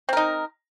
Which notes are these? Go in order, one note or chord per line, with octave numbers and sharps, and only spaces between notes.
C4 D#4 A#4